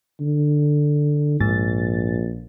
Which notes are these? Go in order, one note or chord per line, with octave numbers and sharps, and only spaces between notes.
D3
A#1 G#2 A6